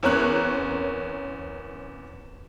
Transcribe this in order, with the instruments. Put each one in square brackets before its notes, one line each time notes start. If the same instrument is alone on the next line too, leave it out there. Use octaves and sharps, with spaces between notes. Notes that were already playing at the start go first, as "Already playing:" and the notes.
[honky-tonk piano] E2 C4 C#4 A#4 C#5 F#6